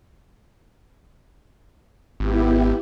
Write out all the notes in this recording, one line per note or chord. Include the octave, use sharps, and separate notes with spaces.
G#1 B3 E4 G4